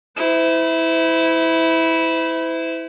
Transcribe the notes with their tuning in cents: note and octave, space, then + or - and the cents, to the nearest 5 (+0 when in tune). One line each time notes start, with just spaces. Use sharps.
E4 -15 C5 -40